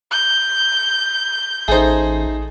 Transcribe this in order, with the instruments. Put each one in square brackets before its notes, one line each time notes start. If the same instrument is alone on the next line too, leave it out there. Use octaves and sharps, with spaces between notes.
[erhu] G6
[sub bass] A1 [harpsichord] A3 D#4 [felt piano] G#4 C5